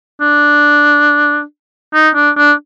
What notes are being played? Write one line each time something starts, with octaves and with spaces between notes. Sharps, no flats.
D4
D#4
D4
D4